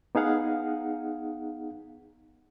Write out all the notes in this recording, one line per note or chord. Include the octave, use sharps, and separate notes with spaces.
B3 D#4 G#4 F5 F#5